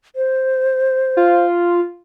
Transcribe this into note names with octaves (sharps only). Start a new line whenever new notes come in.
C5
F4